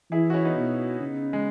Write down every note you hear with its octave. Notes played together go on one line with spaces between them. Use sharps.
E3 E4 G#4
F#4
C#4 E4
B3 D#4
B2
C#3
G#3